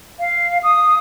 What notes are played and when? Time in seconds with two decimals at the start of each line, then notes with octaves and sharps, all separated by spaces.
0.20 F5
0.63 D#6